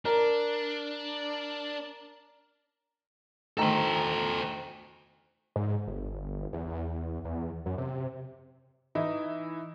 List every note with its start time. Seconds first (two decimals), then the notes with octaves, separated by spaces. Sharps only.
0.05 D4 A#4
3.57 D2 D#3 A4 C5 A#5
5.56 G#2
5.87 G1
6.53 E2
7.25 E2
7.66 F#2
7.78 C3
8.95 E3 D#4 E4